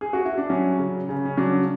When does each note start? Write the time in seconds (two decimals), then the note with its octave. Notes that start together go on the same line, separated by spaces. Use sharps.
0.01 G#4
0.13 F#4
0.25 E4
0.38 D4
0.49 F#3 C#4
0.79 C#3
1.09 C#3
1.25 C#4
1.37 F#3 D4